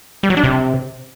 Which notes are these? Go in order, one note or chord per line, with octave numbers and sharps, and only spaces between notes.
G3
F#3
D4
C3